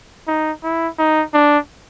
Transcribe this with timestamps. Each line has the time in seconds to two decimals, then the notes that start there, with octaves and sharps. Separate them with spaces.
0.27 D#4
0.63 E4
0.99 D#4
1.34 D4